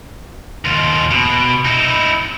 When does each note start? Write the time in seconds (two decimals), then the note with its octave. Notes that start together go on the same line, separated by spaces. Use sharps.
0.65 D#2 F4
1.11 B2
1.65 D#4 E4